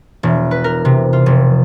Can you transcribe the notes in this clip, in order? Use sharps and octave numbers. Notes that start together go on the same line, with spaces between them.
E1
B4
A#4
C3
F4
F1